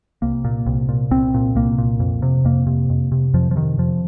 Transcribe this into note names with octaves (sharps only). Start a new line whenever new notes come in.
C2 A#3
A#2
C2
A#2
C2 C4
A#2
C2 A#3
A#2
F2
C3
F2 A#3
C3
F2
C3
F2 F3
F3
C3 D#3
F2 F3